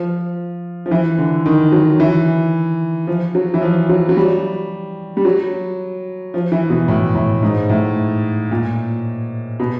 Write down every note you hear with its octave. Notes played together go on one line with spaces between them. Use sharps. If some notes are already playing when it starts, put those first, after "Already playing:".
Already playing: F3
F3
E3
D3
D#3
F#3
E3
F3
F#3
E3
F3
F#3
F#3
G3
G3
F#3
F3
E3
B2
A2
A2
G#2
A2
A#2
B2